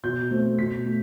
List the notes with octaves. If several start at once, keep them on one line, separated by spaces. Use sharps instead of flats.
B2 G6
A3 C4
B2 B6
A3